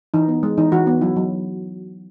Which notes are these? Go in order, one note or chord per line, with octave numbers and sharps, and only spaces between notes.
E3 D#4
B3
G#3
E3 D#4
E3 F#4
B3
F#3 E4
F#3